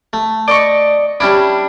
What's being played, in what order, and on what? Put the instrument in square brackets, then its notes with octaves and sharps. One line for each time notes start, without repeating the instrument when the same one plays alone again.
[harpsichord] A3
[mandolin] D5 D#5 C#6
[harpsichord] G3 C#4 E4 [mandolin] D4